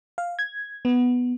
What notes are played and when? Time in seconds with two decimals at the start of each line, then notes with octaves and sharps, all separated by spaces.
0.18 F5
0.39 G#6
0.85 B3